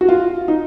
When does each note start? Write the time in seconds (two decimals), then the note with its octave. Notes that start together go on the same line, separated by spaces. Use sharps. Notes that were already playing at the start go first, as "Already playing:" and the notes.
0.01 F#4
0.09 F4
0.48 D#4